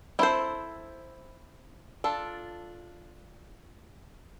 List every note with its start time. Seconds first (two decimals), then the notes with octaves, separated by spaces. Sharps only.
0.19 C4 E4 A4 C5
2.04 D4 F4 A4